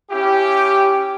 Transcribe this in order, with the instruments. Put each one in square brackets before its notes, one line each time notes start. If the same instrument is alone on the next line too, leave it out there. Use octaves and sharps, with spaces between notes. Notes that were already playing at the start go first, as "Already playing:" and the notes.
[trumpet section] C#4 E4 G4